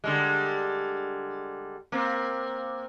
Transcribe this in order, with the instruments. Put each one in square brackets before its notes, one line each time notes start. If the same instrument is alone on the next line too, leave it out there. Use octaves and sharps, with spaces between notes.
[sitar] D3 G3 G#3
A#3 C4